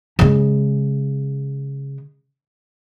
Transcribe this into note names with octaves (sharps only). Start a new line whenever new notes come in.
C#3 G#3